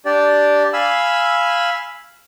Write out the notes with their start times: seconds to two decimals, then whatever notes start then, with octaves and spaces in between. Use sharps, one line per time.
0.05 D4 G4 D5
0.73 F5 G#5 B5 E6